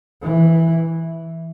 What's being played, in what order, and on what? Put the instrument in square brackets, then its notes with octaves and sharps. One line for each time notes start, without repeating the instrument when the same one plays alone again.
[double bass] E3